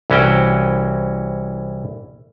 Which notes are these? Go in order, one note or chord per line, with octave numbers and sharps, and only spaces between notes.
C2 E3 C#4 F#4 G5